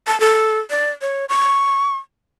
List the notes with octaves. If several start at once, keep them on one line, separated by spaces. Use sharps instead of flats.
A5
A4
D5
C#5
C#6